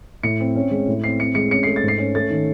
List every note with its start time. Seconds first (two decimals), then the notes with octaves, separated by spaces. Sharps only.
0.23 A2 C#7
0.40 C4
0.55 C#4
0.71 G#3
0.88 A2
1.04 C4 C7
1.19 C4 C#7
1.35 G#3 C#7
1.51 C#4 C#7
1.63 A3 C7
1.76 A6
1.83 G#2
1.88 C7
1.98 C#4
2.15 A3 A6
2.30 D#3